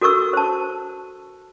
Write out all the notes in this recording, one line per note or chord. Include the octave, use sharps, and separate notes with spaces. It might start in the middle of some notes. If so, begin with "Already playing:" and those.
F#4 A4 A#4 C#6 E6
C5 A5